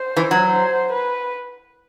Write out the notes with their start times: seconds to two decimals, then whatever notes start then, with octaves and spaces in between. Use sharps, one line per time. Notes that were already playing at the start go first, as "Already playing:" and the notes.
Already playing: C5
0.17 E3
0.31 F#3
0.47 C5
0.92 B4